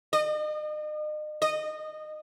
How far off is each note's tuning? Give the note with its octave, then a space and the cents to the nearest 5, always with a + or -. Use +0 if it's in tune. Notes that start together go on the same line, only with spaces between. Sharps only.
D#5 -40
D#5 -20